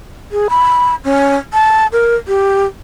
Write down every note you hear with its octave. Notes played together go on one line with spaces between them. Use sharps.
G#4
B5
C#4
A5
A#4
G4